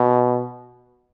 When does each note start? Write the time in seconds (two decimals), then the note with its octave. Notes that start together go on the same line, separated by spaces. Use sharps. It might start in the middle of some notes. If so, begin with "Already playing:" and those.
Already playing: B2